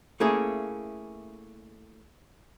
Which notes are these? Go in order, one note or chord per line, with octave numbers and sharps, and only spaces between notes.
A3 A#3 C#4 E4 G#4